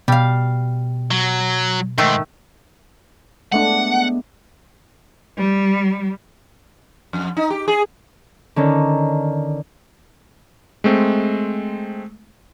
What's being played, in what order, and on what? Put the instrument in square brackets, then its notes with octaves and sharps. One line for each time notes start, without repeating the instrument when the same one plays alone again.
[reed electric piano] B2 [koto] G3 F5
[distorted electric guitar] F#3
[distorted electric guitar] G#2 [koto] D#3 A3
[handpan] G#3 A3 D4 [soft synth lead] B3 [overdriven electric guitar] F#5
[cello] G3
[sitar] F2
D#4
G4
G#4
[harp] D3 D#3 C#4 D#4
[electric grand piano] G#3 A3 C4